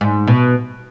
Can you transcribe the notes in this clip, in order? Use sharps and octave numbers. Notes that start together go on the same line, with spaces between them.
G#2
B2